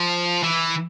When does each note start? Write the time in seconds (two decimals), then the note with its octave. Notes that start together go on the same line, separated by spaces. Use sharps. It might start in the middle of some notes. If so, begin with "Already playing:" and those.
Already playing: F3
0.43 E3